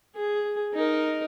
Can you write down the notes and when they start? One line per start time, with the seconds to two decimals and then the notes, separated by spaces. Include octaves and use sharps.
0.15 G#4
0.73 D#4 A#4